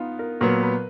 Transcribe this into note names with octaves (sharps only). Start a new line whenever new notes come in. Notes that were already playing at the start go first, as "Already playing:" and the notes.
Already playing: B3 D#4 F4
A#4
A#2 F#3 B3 A#4
B4